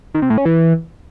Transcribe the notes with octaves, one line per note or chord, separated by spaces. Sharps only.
D#3
C3
A2
C#4
E3